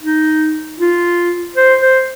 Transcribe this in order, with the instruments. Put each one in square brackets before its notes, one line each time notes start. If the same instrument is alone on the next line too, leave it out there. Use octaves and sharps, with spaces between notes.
[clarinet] D#4
F4
C5
C5